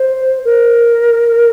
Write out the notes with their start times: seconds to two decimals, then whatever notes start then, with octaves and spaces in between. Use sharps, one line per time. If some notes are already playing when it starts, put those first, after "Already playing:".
Already playing: C5
0.45 A#4